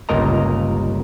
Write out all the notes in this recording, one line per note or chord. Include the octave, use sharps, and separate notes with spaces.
G1 C#2 A#2 A#4 D#5 A#5